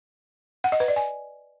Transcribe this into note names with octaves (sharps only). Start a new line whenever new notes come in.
F#5
D#5
B4
D5
G#5